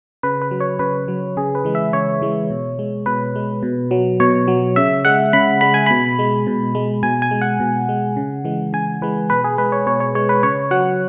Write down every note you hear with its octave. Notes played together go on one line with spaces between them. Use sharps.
C#3 B4
B4
F#3
C#5
C#3 B4
F#3
C#3 G#4
B4
E3 G#3
E5
C#3 C#5
E3 G#3
B2
G#3
B2 B4
G#3
B2
F#3
B2 C#5
F#3
C#3 E5
G#3 F#5
C#3 B5
G#3 B5
G#5
B2 B5
G#3
B2
G#3
B2 G#5
G#5
G#3
F#5
B2
G#3
C#3
E3 G#3
C#3 G#5
E3 G#3 B4
B2 B4
G#4
G#3 B4
C#5
B2 C#5
C#5
G#3 C#5
B4
C#3 C#5
F#3 F#5